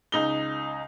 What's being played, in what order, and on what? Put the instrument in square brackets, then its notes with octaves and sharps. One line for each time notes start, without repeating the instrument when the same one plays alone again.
[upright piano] C#2 D#4 G7